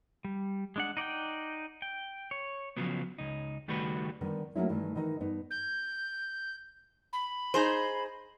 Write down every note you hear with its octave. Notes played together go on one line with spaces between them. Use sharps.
G3
G#3 D4 F#5
D#4 D5 F#5 G5
G5
C#5
C#3 F3 F#3 B3
C#2 D#4
C#2 D#3 G3 A3 F#4 B4
D3 D#3 G3 B3 D#4
F#3 A3 A#3 C#4 D#4 E4
G2 D#3 E3 A3
D#3 E3 D#4 D#5
G2 B3 D#4
G6
B5
D#4 G#4 C5